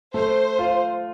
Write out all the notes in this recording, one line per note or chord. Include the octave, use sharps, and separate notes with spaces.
A3 C5
F4